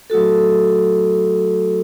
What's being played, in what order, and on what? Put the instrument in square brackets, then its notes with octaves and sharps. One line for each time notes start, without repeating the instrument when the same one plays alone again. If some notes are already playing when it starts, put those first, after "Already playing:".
[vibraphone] F#3 A3 F#4 A4